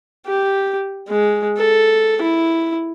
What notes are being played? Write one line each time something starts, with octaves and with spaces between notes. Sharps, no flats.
G4
G#3
A4
E4